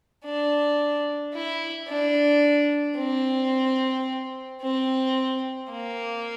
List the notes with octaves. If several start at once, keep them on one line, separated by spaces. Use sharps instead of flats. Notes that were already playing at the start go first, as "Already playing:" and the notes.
D4
E4
D4
C4
C4
A#3